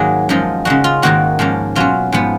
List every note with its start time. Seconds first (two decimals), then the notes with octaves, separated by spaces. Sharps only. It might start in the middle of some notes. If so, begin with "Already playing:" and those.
Already playing: G#2 D#3 F#3 A#3 D#4 G#4
0.29 F#2 F3 G#3 D#4
0.65 C#3 G#3 D#4 F#4
0.84 F4
1.02 G#2 D#3 A#3 D#4 F#4
1.39 G#2 F3 A#3 C#4
1.75 B2 F#3 C#4 F4
2.12 G#2 F3 B3